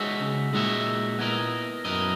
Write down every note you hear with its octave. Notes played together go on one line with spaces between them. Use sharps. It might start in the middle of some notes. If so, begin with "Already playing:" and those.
Already playing: G#3 D#4 F#4 C#5 E5
C#3
A#2 G#3 D#4 F#4 C#5 E5
B3 E4 A#4 D#5
F#2 B3 E4 A#4 D#5